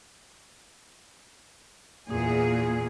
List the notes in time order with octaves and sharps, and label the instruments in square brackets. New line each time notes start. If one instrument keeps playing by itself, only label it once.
[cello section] E2 A#2 G#4